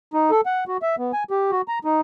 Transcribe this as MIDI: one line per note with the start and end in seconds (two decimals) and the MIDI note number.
0.14 0.31 63
0.31 0.41 69
0.46 0.64 78
0.68 0.77 66
0.82 0.96 76
0.98 1.12 59
1.13 1.24 80
1.31 1.51 67
1.51 1.62 66
1.68 1.79 82
1.85 2.01 63